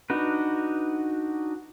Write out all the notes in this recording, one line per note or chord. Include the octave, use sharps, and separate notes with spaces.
D4 D#4 F#4 B4